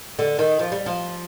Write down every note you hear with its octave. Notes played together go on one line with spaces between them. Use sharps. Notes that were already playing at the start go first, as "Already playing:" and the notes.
D3
D#3
F3
G3
F3